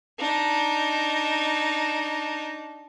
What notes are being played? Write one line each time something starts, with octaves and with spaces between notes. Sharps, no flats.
D4 D#4